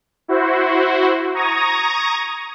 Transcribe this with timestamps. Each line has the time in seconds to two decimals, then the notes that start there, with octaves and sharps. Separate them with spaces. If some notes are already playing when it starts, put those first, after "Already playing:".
0.28 E4 F#4 C5
1.34 A#5 C#6 D#6 G#6 A#6